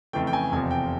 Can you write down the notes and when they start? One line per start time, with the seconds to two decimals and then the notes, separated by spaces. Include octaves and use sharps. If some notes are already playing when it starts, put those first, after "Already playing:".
0.13 F2 C#3 E3 A3 G5
0.27 G5
0.33 G#5
0.52 F1 E2 C3 F3 G#5
0.71 G5